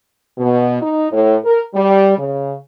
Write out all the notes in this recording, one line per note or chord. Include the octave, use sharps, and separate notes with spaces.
B2
D#4
A2
A#4
G3
C#3